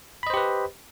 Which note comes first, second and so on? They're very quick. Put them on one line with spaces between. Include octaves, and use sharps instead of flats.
B5 D#5 C5 G4 B4